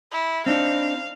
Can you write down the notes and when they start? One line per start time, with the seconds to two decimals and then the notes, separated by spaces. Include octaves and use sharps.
0.12 E4
0.46 C4 D4 D#4 F5